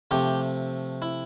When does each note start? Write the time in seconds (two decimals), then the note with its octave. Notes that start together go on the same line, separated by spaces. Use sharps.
0.11 C3 F3 A3 G4
1.02 E4